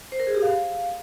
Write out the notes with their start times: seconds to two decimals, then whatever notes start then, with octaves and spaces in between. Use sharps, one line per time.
0.12 C5
0.20 A#4
0.27 G#4
0.35 G4
0.42 F5